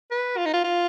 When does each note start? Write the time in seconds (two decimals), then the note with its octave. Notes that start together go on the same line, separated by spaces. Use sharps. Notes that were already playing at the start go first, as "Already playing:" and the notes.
0.11 B4
0.38 F4
0.46 D#4
0.54 F4
0.64 F4